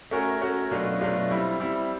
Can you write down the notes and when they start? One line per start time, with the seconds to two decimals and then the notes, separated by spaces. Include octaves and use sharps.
0.11 A3 C#4 F#4 A#4
0.41 A3 C#4 F#4 A#4
0.71 B2 F#3 A3 D4 F4
1.01 B2 F#3 A3 D4 F4
1.30 G3 C4 E4
1.60 G3 C4 E4